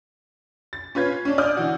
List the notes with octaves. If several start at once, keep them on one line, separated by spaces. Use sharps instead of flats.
A6
C#4 F4 B4 G#6
C#4 D4
D5 D#6 F6 G6
D3 E3 F#4